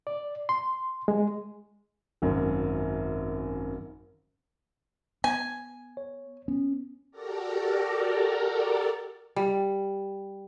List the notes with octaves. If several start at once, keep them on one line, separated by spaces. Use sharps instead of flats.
D5
C6
G#3
G#1 F#2
B3 G#5
C#5
B3 C#4
F#4 G4 A4 A#4 D5 A#5
G3